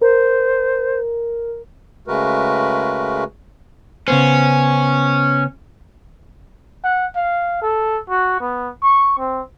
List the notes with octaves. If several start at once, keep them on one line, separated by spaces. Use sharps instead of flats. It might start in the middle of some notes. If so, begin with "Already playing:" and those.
A#4 C5
C#3 G#3 A3 F#4 A#4 B4
C#3 B3 C#4 C5
F#5
F5
A4
F#4
B3
C#6
C4